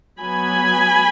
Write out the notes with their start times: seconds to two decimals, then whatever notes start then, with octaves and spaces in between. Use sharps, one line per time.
0.20 F#3 B3 G#5 B5